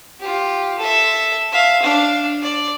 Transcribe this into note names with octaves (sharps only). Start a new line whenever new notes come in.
F4 G4
A4 E5
E5 F5
D4 F5
D5